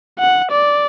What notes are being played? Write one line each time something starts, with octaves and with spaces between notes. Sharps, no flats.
F#5
D5